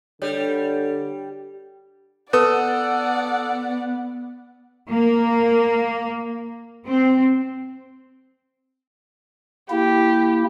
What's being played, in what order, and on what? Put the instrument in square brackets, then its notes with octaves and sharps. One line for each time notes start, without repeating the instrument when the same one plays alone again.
[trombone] D3 [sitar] G3 [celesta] C#5
[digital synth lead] B3 [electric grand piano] A4 D#6 [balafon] B4 [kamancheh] D5 F#5
[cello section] A#3
C4
[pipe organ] A#3 E4 [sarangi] G4